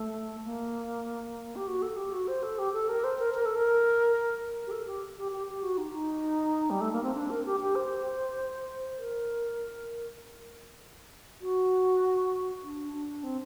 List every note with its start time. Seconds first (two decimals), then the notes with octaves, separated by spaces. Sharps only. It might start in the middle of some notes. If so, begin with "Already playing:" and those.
Already playing: A3
0.45 A#3
1.56 G4
1.67 F#4
1.82 A4
1.97 G4
2.12 F#4
2.28 C5
2.43 A4
2.59 G4
2.73 A4
2.89 A#4
3.04 C5
3.19 A#4
3.34 A#4
3.45 A4
3.56 A#4
4.67 G4
4.71 A4
4.86 G4
5.17 G4
5.32 G4
5.47 G4
5.63 F#4
5.77 D#4
5.93 D#4
6.70 G3
6.81 A3
6.93 A#3
7.03 C4
7.14 D4
7.30 A#4
7.46 G4
7.60 G4
7.75 C5
8.97 A#4
11.41 F#4
12.63 D4
12.93 D4
13.23 C4